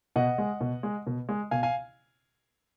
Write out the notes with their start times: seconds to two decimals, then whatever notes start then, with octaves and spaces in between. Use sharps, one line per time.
0.16 B2 D#5 F#5
0.38 G#3
0.61 B2
0.83 G#3
1.07 B2
1.29 G#3
1.51 B2 F5 G#5
1.63 F5 G#5